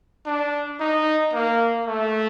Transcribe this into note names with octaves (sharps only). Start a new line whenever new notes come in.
D4
D#4
A#3
A3